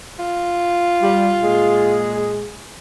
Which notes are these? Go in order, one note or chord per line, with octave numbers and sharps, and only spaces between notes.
F4
G3
A#2 G#3 G#4